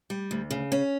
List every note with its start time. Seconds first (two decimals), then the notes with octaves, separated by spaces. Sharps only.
0.10 G3
0.31 D2
0.51 C#3
0.72 C#4